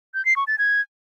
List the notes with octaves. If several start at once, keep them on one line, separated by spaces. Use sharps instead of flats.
G6
C7
C#6
A6
G#6